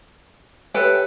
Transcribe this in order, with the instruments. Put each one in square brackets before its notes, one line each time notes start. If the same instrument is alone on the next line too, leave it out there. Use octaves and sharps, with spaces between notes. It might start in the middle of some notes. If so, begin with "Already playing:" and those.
[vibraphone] G4 C#5 E5 [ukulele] A4 B4 G5